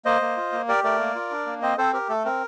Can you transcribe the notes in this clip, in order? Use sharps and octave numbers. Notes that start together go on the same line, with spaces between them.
A#3 C5 D#5
A#3
F4
A#3
G4 A#4 D5
A3 A#4 D5
A#3
F4
D4
A#3
C4 C5 D#5
C4 A4 C5
G4 A#4
A3 A4
C4 A#4